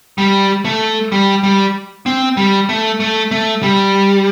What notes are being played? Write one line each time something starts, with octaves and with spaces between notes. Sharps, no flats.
G3
A3
G3
G3
C4
G3
A3
A3
A3
G3